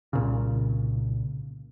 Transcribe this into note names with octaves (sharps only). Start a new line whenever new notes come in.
C2 A#2 C#3